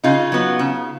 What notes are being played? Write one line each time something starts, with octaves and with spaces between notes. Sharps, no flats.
C#3 D#4 F4
F#3 B3
C#3